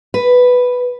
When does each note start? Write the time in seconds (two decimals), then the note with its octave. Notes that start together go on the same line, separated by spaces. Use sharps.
0.14 B4